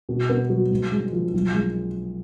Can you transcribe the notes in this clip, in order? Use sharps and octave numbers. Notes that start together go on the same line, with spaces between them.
B2
B3
F#3
G#2
G#3
F3
B1
G#3